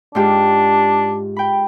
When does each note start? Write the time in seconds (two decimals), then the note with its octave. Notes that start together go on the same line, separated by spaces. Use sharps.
0.15 G#2 D4 F4 G4
1.36 G5 B5